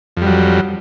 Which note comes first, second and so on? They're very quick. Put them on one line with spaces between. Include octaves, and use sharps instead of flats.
F2 G3 F#3